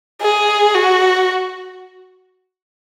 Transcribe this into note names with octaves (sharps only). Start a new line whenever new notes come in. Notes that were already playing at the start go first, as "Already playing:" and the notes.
G#4
F#4